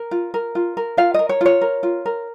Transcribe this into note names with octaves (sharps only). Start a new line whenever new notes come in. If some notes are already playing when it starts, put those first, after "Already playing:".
Already playing: A#4
F4
A#4
F4
A#4
F4 F5
A#4 D#5
C#5
F4 C#5
A#4
F4
A#4